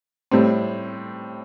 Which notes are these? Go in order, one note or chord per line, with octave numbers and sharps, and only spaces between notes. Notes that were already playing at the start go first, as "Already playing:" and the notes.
A2 G3 C4